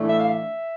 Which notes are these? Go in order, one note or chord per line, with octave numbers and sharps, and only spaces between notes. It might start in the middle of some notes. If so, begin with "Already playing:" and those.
Already playing: A2 E3 A3 D4
E5
F5
E5